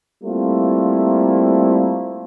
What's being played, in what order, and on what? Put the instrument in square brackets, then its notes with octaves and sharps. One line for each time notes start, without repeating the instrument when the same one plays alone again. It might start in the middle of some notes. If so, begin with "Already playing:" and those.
[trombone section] G3 A3 A#3 C4 E4 F4